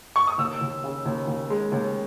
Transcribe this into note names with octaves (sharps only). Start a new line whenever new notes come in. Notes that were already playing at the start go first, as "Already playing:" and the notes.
C#6
D#6
D#2 E6
D#2
C#3
D#2
D#2
G#3
D#2